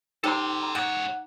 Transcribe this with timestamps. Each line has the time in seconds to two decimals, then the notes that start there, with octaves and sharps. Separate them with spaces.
0.24 D#4 G4 A4 C5 A#5 C6
0.63 A#5
0.75 G#2 C#5 F#5